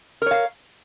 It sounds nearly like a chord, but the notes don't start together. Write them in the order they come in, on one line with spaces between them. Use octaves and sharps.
A#4 C#5 F5